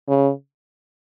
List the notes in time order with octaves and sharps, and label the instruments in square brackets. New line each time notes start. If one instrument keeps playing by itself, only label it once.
[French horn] C#3